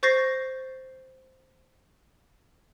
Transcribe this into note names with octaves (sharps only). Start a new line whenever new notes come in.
C5 C#6 G6 A6 A#6 C7